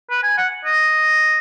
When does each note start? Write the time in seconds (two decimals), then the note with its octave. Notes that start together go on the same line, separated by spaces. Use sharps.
0.10 B4
0.24 G#5
0.38 F#5
0.65 D#5